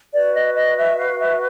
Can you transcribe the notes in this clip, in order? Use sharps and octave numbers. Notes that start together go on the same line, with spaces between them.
F#4 B4 D5
D#5
D#5
E5
F5
E5